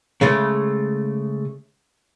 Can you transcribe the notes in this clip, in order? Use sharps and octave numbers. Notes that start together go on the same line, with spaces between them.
C#3 G#3 A3